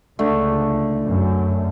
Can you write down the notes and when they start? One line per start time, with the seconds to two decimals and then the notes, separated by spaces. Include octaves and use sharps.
0.19 C#2 D3 A3
1.07 F#2